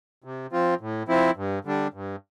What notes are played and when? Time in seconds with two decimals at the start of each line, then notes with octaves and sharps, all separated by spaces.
0.24 C3
0.52 F3 C4 F4
0.80 A2
1.08 F3 C4 E4
1.37 G2
1.65 D3 G3 D4
1.93 G2